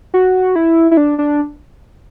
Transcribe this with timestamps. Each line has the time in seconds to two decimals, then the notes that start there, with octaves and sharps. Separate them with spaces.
0.14 F#4
0.56 E4
0.91 E4
0.97 D4
1.18 D4